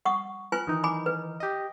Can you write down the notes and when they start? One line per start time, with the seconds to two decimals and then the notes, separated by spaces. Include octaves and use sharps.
0.05 F#5 C#6 D#6
0.52 F4 B4 G#5 F#6
0.67 D#3 E3 D#4
0.84 G#5 B5 D6
1.06 B4
1.40 G4 D#5